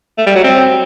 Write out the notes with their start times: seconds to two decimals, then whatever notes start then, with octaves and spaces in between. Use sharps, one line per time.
0.18 A3
0.27 G3
0.35 F#3
0.44 C4